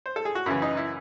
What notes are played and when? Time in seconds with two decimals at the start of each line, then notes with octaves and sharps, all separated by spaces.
0.06 C5
0.16 A4
0.25 G#4
0.35 F#4
0.46 F#2 C#3 E3 E4
0.62 D#4
0.77 E4